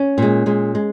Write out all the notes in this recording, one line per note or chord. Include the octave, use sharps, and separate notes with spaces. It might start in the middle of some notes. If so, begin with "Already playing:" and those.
Already playing: C#4
A#2 G#3
A#2 G#3
G#3